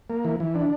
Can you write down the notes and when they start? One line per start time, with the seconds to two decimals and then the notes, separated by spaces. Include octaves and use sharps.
0.10 A#3
0.25 E3
0.40 E3
0.55 D4